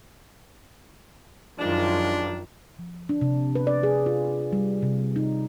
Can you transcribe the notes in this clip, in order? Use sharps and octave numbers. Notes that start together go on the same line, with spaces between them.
F#2 D#3 F3 G3 G#3 D4
F3
D4
C3
B4
D5
G#4
F4
G3
C3
D#4